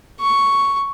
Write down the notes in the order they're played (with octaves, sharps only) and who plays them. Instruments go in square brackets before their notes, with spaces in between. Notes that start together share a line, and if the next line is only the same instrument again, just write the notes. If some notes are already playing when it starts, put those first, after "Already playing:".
[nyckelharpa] C#6